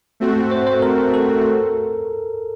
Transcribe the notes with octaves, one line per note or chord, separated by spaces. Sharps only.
A3 C4 F#4
C5
C5
A#4
A4